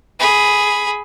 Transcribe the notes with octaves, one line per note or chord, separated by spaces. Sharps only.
G#4 B5